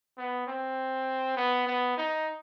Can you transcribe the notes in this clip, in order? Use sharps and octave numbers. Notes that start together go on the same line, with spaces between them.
B3
C4
B3
B3
D#4